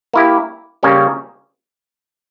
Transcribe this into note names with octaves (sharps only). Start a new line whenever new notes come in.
A#3 E4 G4
C#3 G3 A#3 C#4 G4